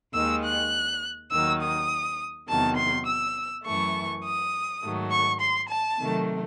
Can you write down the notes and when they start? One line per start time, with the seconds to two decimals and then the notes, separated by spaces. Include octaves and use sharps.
0.14 D#2 D#3 G#3 E6
0.43 F#6
1.31 D#2 D#3 F#3 E6
1.61 D#6
2.48 E2 C3 D#3 F#3 A5
2.77 C6
3.06 E6
3.64 F#2 E3 A3 C#6
4.24 D#6
4.82 G#2 D#3 F#3 A3
5.11 C#6
5.40 C6
5.69 A5
5.99 C3 D#3 F#3 A3